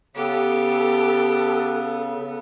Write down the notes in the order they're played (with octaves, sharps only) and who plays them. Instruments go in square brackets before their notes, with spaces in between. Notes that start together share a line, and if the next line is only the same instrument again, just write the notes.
[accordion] C#3 [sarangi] B3 [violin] G4 [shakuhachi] A4